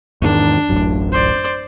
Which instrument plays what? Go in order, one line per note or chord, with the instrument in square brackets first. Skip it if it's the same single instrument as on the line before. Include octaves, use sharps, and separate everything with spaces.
[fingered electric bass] E2 G#2 D#3 [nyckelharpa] D4
[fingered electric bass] D1 A1 F#2
[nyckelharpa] C5 D5